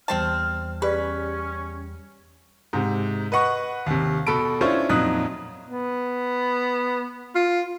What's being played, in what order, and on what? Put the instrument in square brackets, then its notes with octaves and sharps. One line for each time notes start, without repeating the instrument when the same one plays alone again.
[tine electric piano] E2 G3 G5 [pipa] C4 C5 A5 [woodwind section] F6
[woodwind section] C#4 [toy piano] G4 G#4 D5 [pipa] B4
[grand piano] G#2 C3
B4 D#5 F#5 C#6
D#2 C3
B2 A4 A5 B5 D7
C#4 D4 E4 F4 C5 C#5
F2 A#2 F#3 D#4 D#6 F#6
[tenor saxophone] B3
F4